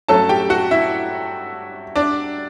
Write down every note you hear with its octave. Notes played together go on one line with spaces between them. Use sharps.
G2 F#3 A3 C#4 A4 A5
G4 G5
F#4 F#5
E4 E5
D4 D5